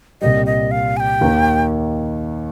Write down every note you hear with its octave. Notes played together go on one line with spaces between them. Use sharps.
C2 A#2 G3 D#5
D#5
F5
G#5
G5
D#2 D#3 A#3